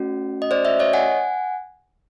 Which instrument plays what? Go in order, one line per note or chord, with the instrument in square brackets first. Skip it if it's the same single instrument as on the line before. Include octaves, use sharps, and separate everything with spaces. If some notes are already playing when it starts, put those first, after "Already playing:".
Already playing: [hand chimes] A3 C#4 F#4
D#5
C5 D5
D5 E5
C#5 D#5
F#5 G#5